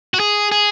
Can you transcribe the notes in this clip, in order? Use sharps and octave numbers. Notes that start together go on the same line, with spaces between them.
F#4
G#4
G#4